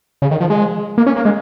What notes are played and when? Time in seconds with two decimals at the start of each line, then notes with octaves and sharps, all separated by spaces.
0.22 C#3
0.31 D#3
0.40 F3
0.50 G#3
0.98 A#3
1.06 C#4
1.16 A#3
1.25 G#3